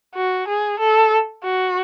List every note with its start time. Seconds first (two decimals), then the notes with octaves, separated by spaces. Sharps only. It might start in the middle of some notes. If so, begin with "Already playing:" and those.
0.16 F#4
0.48 G#4
0.79 A4
1.44 F#4